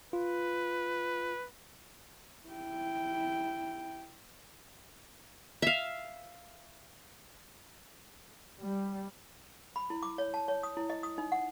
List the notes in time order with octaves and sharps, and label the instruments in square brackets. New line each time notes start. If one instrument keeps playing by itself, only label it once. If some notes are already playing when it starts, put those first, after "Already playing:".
[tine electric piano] F4 [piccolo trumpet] B4
[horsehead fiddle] E4 G5
[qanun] E5 F5
[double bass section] G3
[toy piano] B5
E4
D6
C#5
A5
C#5
D#6
E4
D#5
D#6
D#4
F#5